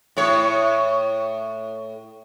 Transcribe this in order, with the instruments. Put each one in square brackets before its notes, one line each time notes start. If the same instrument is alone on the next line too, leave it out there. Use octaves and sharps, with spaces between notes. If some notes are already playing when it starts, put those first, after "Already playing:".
[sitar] A2 C#5